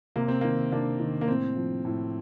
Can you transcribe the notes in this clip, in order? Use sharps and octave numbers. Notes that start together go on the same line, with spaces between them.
C3 A#3
C4
D#3 A#3
C3 A#3 D4
D#3
A#3
A2 C4
F3
A2